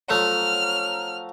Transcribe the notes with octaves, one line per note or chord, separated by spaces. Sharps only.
F3 F#3 A3 F6